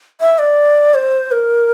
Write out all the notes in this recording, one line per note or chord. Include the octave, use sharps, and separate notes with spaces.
E5
D5
C5
A#4